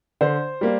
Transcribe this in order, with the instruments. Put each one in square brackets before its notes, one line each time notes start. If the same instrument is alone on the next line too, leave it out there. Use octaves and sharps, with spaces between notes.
[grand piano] D3 [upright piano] C5
[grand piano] G3 A#3